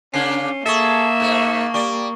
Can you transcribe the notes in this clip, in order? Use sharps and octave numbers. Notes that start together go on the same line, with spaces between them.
C#3 A#3 C#4 D4 C7 G7
A#3 G#4 A4 E5 C#6 D#6 A6
G#2 A3
G3 D5 C#6